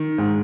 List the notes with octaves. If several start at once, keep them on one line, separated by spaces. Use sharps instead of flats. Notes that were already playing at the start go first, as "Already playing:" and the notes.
Already playing: D#3
G#2